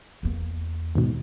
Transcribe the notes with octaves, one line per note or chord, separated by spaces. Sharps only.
E2 A#3
D#2 G#2 B2